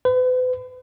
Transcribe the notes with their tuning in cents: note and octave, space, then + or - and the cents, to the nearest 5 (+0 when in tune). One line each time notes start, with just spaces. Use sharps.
B4 +40